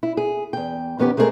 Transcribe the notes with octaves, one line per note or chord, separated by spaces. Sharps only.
E4
G#4
E2 G5
F2 D#3 B3 C#4 G4
G#3 A3 C4 C#4 G#4 A#4